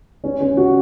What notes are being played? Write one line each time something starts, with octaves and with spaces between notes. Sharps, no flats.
C#4
C#4
F#4